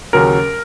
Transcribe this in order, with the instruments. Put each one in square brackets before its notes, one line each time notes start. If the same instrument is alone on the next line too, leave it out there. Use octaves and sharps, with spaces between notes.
[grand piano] D#2 C#3 F#3 C#4 A#4